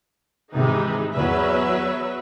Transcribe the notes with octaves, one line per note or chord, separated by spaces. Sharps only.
G#2 C3 D#3 E3 G#3 D#4
E2 F#3 B4 E5